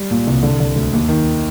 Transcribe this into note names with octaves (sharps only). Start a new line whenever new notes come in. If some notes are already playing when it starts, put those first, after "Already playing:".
Already playing: G3
A#2
C2
D3
D3
D2
D#2
D#3